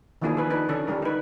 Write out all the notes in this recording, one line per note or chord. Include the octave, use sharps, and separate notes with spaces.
D#3 F3 A#3 D4 E4 G#4
G#4 B4
D4 D#4 B4
D3 C#4 D4 A4
D3 G3 D4 A#4
D#4 B4